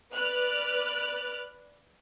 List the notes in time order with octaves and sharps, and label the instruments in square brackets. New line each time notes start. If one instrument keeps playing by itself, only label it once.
[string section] B4 D5 F6 F#6